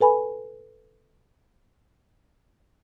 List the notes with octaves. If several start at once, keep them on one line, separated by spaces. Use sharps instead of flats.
A4 B4 G#5 B5